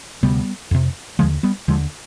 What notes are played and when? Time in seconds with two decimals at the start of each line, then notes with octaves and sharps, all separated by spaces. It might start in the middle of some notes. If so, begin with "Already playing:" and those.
0.23 D2 C3 G3 B3
0.71 F2 C3
1.19 D#2 D3 F3 G#3
1.43 G3 B3
1.68 D#2 D3 F3 G#3